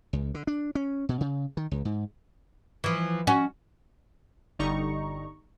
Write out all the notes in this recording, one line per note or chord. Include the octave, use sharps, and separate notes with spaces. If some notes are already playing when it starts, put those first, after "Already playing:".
C#2
D3
D4
C#4
B2
C#3
D#3
C#2
G#2
E3 F3
C#4 F#4
G1 D3 G3 D#4 A#5 C#6